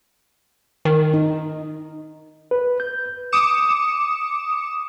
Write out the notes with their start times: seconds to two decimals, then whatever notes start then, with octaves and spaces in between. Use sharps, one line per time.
0.85 D#3
1.14 D#4
2.51 B4
2.80 G6
3.32 D6 D#6 C#7 E7